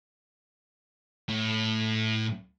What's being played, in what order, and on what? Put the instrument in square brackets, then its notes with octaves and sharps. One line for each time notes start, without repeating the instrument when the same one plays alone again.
[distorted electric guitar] A2